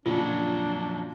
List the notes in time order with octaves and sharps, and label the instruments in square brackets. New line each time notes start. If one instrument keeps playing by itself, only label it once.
[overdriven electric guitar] F2 F#3 [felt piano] A#2 C#3 [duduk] D4 [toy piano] F4